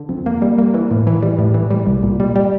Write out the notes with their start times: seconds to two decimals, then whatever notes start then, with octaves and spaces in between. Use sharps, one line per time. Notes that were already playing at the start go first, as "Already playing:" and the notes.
Already playing: D3
0.09 F2
0.26 A#3
0.42 G3
0.58 A#3
0.74 E3
0.91 A2
1.07 E3
1.23 G3
1.39 A2
1.54 E3
1.71 G3
1.87 C2
2.03 A#2
2.20 G3
2.36 G3